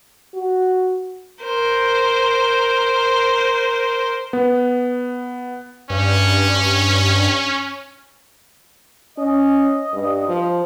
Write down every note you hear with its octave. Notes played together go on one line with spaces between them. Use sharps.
F#4
A#4 C5
B3
G2 C#4
C#4 D#5
G2
F3